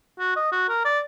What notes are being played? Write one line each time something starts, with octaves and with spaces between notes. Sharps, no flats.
F#4
D#5
F#4
A#4
D5